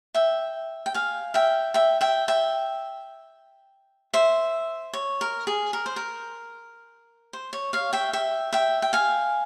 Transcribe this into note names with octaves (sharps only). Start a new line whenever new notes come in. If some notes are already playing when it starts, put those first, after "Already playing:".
E5 G5
G5
F5 G#5
E5 G5
E5 G5
E5 G5
E5 G5
C5 E5
C#5
A#4
G#4
A#4
C5
A#4
C5
C#5
C#5 F5
E5 G5
E5 G5
E5 G5
G5
F5 G#5